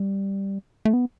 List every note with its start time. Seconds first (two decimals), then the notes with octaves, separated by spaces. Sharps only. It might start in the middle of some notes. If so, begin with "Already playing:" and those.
Already playing: G3
0.85 A3
0.93 B3